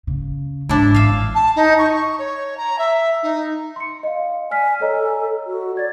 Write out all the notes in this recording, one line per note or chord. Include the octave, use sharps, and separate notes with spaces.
C#3
G#2 D4 E4
A1 E5 F5
A5
D#4
C#6
C#5
A#5
E5
D#4
C6 C#7
D#5 F5
D5 G#5 F6 B6
A4 C#5 D#5 A#5
F#4
D5 G#6 A6